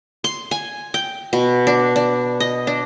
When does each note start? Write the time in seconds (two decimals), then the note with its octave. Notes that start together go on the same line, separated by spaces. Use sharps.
0.24 C6
0.51 G#5
0.94 G5
1.33 B2
1.67 D4
1.96 D4
2.40 D#5
2.67 D4